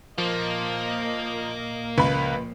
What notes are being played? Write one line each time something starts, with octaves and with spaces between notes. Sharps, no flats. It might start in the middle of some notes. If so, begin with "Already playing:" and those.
A#2 F3 A#3 F4 A#4 D#5
C#2 A#2 F3 B4 B5